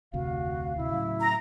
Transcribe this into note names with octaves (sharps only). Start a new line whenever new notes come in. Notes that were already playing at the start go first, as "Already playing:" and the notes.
F1 D2 C3 F#4 F5
D2 C3 E4
A2 C#3 F#3
A#5